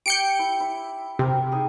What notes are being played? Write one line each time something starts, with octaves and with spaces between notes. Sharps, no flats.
G4 G6 C#7 D7
E4
E4
C3 G4 A#4
D#4 G#4